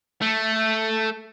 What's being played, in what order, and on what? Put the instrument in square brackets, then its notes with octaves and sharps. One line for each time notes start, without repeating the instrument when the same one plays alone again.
[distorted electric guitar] A3